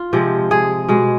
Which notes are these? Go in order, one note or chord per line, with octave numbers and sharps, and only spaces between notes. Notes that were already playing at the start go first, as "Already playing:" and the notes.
Already playing: F4
C3 F3 G#3
G#4
B2 G#3